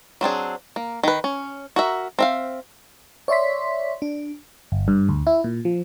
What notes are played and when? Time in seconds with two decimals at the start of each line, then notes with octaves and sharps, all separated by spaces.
0.21 F#3 C4 D4 G#4
0.76 A#3
1.03 D#3 B4
1.24 C#4
1.76 F#4 A#4 E5
2.19 C4 E5 F5
3.28 C#5 D5 E5 C6 B6
4.02 D4
4.72 G1
4.88 G2
5.09 D2
5.27 E4
5.44 A#2
5.65 F3